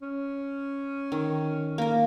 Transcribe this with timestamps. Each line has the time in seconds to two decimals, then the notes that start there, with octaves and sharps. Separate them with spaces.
0.02 C#4
1.12 D#3
1.78 A#3 A#4